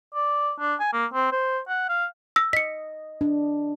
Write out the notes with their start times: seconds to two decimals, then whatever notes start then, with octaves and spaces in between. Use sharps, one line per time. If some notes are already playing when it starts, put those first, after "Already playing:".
0.15 D5
0.60 D4
0.80 G#5
0.93 A#3
1.14 C4
1.32 C5
1.69 F#5
1.89 F5
2.36 E6 A#6
2.53 D#5 B6 C#7
3.21 D4